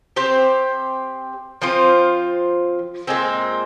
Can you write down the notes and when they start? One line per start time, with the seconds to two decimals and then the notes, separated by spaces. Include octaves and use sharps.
0.16 C4 G4 C5
1.62 F3 C4 F4 C5
3.07 A#2 G#3 C4